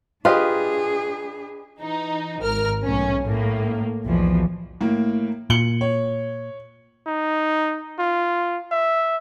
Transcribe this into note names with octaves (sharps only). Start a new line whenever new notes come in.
D4 F4 G4 G#4 B4 D#5
E3 D#4
G#1 A#4 F6
B1 A2 C#4
A2 A#3
B1 E2 B2 E3 F3
A2 A#3
A#2 C#7 F#7 G7
C#5
D#4
F4
E5